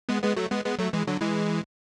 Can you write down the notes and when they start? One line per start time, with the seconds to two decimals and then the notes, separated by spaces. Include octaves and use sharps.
0.09 G#3 B3
0.23 G#3 B3
0.37 F#3 A3
0.51 G#3 B3
0.65 G#3 B3
0.79 F#3 A3
0.93 E3 G#3
1.07 D3 F#3
1.21 E3 G#3